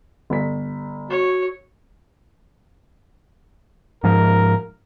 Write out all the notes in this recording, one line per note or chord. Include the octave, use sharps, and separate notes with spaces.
G1 B6
F#4 C#5
G#2 F3 A#4